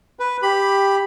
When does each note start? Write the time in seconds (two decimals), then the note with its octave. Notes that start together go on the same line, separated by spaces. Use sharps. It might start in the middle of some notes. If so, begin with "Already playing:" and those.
0.19 B4
0.42 G4 B5